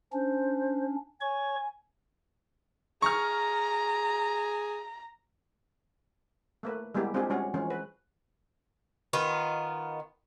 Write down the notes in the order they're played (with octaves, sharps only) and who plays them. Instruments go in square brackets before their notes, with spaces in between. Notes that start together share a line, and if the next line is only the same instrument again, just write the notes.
[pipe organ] C#4 D4 [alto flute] C5
[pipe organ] C#5 C#6 [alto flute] G#5
[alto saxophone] G#4 [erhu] A#5 [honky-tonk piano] C#6 F6
[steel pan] A3 A#3 B4
G3 G#3 A#3 B3 E4 G4
G#3 C4 D4 F4 G4 G#4
G3 G#3 C#4 F#4 G#4
E3 F3 G#3 C#4
B4
[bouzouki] D#3 B3 F4